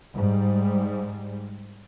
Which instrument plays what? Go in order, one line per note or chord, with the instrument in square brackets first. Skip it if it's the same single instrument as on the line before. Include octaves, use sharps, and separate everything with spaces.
[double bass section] G#2 G3